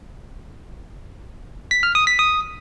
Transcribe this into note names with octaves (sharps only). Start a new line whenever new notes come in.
B6
F6
D#6
B6
D#6